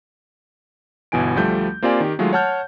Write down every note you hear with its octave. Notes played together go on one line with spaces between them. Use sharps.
G1 B2 E3 G#5 D7
D2 F3 G3 A3 G6
A#3 C4 F4 G4 D5 G#5
D#3 G4
D#3 F#3 G#3 A3 F4
C#5 F#5 A5 F6 G6